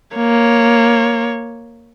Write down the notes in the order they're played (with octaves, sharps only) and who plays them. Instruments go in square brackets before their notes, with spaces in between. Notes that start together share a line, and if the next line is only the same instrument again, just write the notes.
[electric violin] A#3 C#5